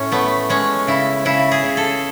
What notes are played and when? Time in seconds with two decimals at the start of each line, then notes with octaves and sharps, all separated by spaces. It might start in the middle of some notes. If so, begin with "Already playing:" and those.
Already playing: A2 C#4
0.12 A3 B3
0.50 G#3 C#4
0.87 C#3 E4
1.25 C#3 E4
1.51 G#4
1.64 C#3
1.77 A4